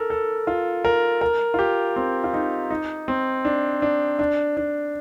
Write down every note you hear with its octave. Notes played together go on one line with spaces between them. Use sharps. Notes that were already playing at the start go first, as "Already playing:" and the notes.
Already playing: A4 A#4
A4
F4
A#4
A#4
F4
G4
C4
F4
D#4
D#4
C4
D4
D4
D4
D4